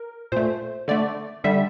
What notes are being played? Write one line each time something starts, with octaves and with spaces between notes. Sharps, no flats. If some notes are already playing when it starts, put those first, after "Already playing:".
Already playing: A#4
A#2 A3 C5
D3 A3 D5
D3 G3 E5